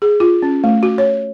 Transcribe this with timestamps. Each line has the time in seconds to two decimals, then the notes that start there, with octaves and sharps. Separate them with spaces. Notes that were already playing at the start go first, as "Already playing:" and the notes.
0.02 G#4
0.20 F4
0.42 C#4
0.64 A3
0.83 F#4
0.98 C#5